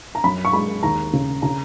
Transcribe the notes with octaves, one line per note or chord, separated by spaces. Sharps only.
A#5
F#2 B5
C#6
G#3 B5
D#2 A#5
C#3
C#3 A#5